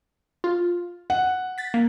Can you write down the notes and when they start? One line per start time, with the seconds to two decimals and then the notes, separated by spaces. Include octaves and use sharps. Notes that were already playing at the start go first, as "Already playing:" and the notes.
0.44 F4
1.10 F#5
1.58 A6 B6
1.74 A#3